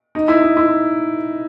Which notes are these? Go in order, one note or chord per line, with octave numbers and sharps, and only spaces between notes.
D#4
E4
D#4
E4